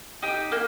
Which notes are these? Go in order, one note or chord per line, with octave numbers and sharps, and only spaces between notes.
D#4 G4
A#3